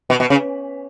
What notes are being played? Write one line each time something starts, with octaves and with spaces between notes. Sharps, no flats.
B2
B2
C#3